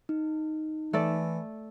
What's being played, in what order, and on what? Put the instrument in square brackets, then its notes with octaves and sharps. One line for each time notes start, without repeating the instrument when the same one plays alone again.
[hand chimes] D#4
[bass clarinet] E3 [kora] A3 A4 D5